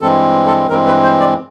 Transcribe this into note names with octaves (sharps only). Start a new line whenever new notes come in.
G2 E3 G#3 C4 A4
A4
G2 E3 G#3 C4 A#4
B4
C5
D5